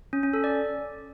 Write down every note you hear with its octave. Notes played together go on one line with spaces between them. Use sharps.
C#4
C#4
A4
D5